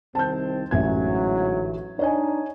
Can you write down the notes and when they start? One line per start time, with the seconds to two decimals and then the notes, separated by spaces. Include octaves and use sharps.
0.15 C2 D#3 C4 A5 G6
0.71 A1 G#2 D3 E3 F#3 G#6
1.99 D4 D#4 C#5 D#5 G#5